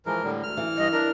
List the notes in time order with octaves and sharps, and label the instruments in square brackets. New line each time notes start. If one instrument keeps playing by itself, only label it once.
[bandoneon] E3 F3 [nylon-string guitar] G#3 [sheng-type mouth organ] A#4
[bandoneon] A2 D3 G3
[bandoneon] D2 [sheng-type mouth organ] F6
[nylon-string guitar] E3
[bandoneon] G2 [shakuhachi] D#5
[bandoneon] D4 [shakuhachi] A#4